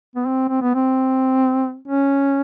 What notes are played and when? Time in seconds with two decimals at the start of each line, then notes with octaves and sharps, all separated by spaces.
0.15 B3
0.26 C4
0.49 C4
0.62 B3
0.75 C4
1.88 C#4